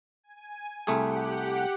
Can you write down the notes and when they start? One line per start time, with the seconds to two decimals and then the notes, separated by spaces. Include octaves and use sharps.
0.24 G#5
0.87 C2 A3 G4 G#4 F#5